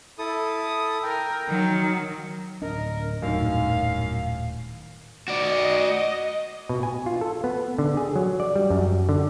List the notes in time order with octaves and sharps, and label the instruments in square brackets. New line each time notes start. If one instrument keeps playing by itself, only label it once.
[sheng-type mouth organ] E4 A4 D#6
[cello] A#4 [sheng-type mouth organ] G5
[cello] D#3 F#3
[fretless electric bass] D1 D4 [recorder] A#4 [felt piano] D#5
[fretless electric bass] D#1 A2 [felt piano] F#2 D#3 [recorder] F5
[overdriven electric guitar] F#4 D5 [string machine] D#5
[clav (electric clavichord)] B2
G#5
F4
A4
B3
D3
G#4
F#3
D5
G3
F#2
D3